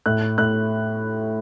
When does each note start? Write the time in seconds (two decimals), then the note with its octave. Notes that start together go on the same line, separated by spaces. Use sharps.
0.06 A2 F#6
0.38 A2 F#6